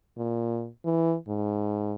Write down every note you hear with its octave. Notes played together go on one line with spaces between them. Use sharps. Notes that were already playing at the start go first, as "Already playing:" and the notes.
A#2
E3
G#2